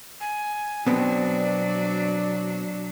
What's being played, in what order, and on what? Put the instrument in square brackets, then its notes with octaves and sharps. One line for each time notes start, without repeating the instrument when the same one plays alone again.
[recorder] G#5
[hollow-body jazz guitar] B2 B3 C4 [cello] F#3 D4 [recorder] D5